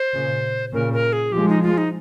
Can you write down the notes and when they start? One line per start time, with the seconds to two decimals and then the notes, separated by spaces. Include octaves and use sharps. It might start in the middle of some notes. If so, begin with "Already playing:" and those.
Already playing: C5
0.13 A#2 C#3
0.73 A#2 C#3 A#4
0.93 A#4
1.13 G#4
1.32 F3 G#3 G4
1.48 D#4
1.63 F4
1.78 D#4